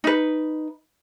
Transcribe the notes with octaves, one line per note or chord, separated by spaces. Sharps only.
D#4 B4